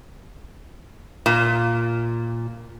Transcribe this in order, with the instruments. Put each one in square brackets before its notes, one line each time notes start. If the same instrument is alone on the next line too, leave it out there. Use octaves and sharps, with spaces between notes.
[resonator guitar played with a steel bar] A#2